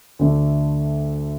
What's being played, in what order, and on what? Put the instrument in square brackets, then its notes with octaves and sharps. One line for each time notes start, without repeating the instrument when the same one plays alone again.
[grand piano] D2 D3 A3